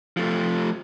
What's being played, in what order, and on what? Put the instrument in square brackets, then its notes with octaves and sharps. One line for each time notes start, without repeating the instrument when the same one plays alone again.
[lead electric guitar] F3 A3